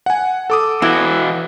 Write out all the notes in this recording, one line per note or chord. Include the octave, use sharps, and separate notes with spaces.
F#5 G#5
A4 D6 D#6
E3 E4 F#4